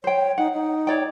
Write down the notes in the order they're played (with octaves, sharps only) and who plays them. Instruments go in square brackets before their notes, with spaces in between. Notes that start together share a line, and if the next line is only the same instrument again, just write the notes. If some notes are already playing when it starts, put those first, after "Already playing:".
[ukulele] C5 G5 [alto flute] C#5
[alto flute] D#4 [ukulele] F#5
[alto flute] D#4
[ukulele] C#5 D5 G5